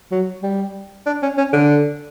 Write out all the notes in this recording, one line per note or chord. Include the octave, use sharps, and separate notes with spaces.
F#3
G3
D4
C#4
C#4
D3